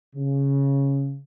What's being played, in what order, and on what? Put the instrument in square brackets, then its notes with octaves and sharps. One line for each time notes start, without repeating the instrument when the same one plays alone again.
[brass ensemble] C#3